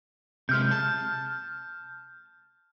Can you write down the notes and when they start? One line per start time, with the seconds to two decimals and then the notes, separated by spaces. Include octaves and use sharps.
0.49 C3 G#3 F6 G6
0.71 A5